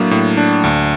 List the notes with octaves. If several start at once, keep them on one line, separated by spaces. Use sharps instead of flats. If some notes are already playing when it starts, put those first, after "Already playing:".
Already playing: A2 F#3 A#3 D4
A2
D4
D2